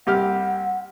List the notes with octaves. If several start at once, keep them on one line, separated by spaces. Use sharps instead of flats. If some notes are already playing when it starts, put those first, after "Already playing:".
C2 G4 F#5 F6